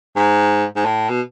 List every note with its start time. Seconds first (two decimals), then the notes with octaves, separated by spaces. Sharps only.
0.16 G#2
0.76 G#2
0.85 A2
1.10 B2